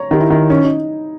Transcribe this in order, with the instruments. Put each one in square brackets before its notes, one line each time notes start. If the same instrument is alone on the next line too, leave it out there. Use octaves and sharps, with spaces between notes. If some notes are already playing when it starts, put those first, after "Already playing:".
Already playing: [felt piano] C#5 A#5
[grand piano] D#3 [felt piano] G4
[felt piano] E4
[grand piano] D#3
[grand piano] C#4 [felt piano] D#4
[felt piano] D#4